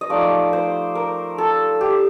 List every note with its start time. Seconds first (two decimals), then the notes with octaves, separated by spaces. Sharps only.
0.01 D#5
0.10 F3 A3 D#4 D5
0.53 C5
0.95 A#4
1.38 A4
1.81 G4